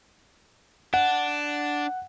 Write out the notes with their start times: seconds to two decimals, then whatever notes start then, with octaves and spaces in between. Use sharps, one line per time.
0.94 D4 F#5